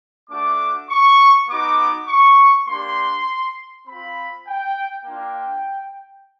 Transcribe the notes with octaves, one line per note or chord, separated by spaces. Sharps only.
A3 D4 F#4 D6
C#6
B3 D#4 F#4 D6
C#6
A#3 D4 G4 C6
C4 F4 B5
G5
A#3 D4 F4 G5